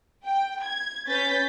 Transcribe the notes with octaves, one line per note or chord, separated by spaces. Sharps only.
G5
G#6
C#4 B4 G6 A6 B6